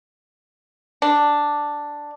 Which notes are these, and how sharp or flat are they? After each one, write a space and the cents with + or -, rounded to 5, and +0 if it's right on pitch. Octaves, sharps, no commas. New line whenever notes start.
D4 +0